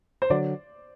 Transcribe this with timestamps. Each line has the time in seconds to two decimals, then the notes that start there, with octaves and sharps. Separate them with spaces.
0.22 C5
0.30 D3 F#3 D5